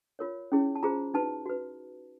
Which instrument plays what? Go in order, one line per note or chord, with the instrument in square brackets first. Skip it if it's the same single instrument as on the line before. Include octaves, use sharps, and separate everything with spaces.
[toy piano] F4 A#4 C#5
C#4 E4 G#4 C#5
A5
F4 G#4 C5 A#5
D#4 F#4 B4 A5
F#4 B4